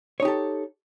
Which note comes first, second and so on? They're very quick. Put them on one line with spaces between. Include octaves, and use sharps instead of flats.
C#5 D#4 G4 A4